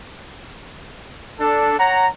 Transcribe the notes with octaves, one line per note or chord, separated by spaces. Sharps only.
D4 A4
C#5 F#5 A#5